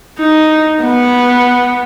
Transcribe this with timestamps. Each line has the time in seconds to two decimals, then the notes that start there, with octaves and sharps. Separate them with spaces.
0.19 D#4
0.82 B3